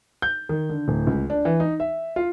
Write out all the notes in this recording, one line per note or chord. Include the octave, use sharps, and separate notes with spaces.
G6
D#3
D3
D1
C#2
D4
E3
D#4
E5
F4